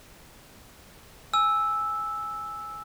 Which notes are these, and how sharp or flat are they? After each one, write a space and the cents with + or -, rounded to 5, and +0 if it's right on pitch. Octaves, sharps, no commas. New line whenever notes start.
G#5 +0 E6 -5